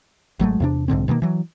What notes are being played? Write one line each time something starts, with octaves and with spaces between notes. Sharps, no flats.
G#1 F#3 G#3 A3
E2 C3 D4
B1 G#2 D3 C4
B2 D#3 G#3 A#3
E3 F#3